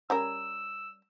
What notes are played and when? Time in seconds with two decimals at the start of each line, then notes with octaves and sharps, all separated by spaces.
0.10 G3 C#4 A#4 E6